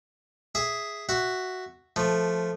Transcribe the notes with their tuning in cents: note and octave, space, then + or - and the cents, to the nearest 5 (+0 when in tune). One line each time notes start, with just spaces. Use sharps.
G#4 +0 E5 +0
F#4 +0 E5 +0
F3 +0 A3 +0